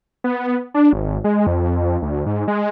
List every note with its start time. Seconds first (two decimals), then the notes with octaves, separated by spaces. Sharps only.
0.24 B3
0.74 D4
0.93 G#1
1.24 G#3
1.47 F2
2.02 D2
2.26 G#2
2.48 G#3